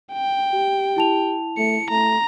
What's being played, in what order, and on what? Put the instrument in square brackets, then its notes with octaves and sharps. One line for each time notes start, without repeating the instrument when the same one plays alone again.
[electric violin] G5
[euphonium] G4
[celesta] E4 A5 F7
[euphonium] A3 [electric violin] C#7
[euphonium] A3 [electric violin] A#5